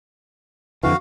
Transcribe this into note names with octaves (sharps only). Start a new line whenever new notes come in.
F2 D3 E3 F#4 F5